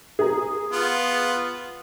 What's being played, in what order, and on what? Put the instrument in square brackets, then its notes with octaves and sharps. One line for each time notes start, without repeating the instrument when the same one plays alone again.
[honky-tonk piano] G#4 A#5
[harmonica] B3 F4